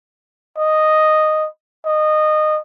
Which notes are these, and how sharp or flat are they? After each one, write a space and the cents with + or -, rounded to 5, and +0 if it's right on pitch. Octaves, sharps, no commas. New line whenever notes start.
D#5 -5
D#5 -20